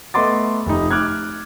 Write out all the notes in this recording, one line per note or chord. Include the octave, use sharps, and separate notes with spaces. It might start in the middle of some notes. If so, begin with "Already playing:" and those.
A3 B3 D#5 C6 D6 A6
F1 D#4
D6 F6 F#6 G#6